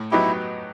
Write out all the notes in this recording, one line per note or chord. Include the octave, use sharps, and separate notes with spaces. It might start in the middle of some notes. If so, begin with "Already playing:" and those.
Already playing: A2
F#3 B3 D#4 E4 G4